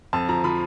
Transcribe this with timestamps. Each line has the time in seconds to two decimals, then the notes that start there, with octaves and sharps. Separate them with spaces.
0.13 F2 A5
0.29 F3 A#5
0.44 F3 B5